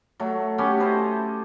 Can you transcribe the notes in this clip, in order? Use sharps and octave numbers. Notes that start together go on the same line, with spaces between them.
F#3 A3
B3 C#4 G4 A4
E4 C5 D#5 A5